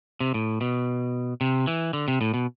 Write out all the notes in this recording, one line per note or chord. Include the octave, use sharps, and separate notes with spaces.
C3
A2
B2
C3
E3
D3
C3
A2
B2